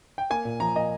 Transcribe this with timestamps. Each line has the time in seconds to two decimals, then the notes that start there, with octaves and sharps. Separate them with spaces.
0.18 G5
0.30 A#3 G#5
0.45 A#2
0.60 F3 A#5
0.76 A#2 D#5